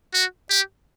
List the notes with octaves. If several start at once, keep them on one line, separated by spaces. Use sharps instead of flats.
F#4
G4